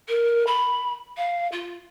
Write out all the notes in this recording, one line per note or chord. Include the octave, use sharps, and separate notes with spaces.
A#4
B5
F5
F4